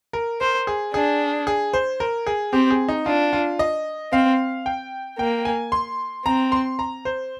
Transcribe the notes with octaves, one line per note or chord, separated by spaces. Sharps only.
A#4
A#4 C5
G#4
D4 G#4
G#4
C5
A#4
G#4
C4 G4
G#4
D#4
D4 F4
F4
D#5
C4 F5
G5
A#3 G5
G#5
C6
C4 A#5
C6
A#5
C5